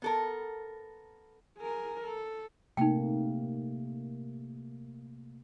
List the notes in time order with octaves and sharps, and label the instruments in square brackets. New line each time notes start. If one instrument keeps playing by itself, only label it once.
[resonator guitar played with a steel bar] B3 A4 A#4
[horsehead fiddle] G#4 A#4
A4
[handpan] C3 A3 A#3 [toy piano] D#4 G5